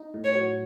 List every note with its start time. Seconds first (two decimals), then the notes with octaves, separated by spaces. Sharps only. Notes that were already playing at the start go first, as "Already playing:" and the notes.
Already playing: D#4
0.14 A2
0.24 C#5
0.35 F#3